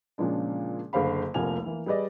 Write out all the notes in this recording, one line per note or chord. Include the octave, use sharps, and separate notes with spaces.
A#2 C#3 F3 G#3 D4
F#1 D3 C5 F5 B5
F1 C2 F3 A#3 G#5 F7
E3 A#3
G3 G#4 B4 D5 D#5